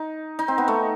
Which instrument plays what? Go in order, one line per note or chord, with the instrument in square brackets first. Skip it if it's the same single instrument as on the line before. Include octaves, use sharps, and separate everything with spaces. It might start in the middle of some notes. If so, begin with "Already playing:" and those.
Already playing: [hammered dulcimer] D#4
D#4
C4
B3
A3